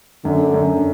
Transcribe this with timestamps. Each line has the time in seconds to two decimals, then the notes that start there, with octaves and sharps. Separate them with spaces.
0.25 F#2 D3
0.54 F#2